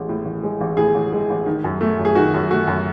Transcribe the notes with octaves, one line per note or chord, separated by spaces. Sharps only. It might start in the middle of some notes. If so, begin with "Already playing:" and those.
Already playing: A1 G#3
A2
A1
G#3
A1
A2 G#4
A1
G#3
A1
D#3
F#2
A3
F#2
G#4
D#3 F#4
F#2
A3 F#4
F#2